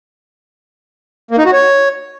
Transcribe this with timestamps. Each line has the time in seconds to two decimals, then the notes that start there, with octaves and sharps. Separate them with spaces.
1.31 A#3
1.38 D#4
1.45 F#4
1.53 C#5